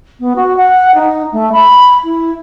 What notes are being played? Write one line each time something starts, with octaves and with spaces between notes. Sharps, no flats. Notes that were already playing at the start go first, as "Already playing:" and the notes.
B3
F#4
F#5
D#4
A3
B5
E4